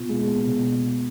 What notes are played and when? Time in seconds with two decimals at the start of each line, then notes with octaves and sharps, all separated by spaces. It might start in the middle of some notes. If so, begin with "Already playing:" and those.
Already playing: B2 B3 F4
0.09 G#3
0.27 B3
0.46 B2